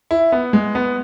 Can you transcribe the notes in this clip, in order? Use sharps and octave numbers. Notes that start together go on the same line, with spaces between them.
E4
B3
G#3
B3